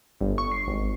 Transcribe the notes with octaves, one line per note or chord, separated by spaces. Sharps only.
G1
C#6
C7
G#1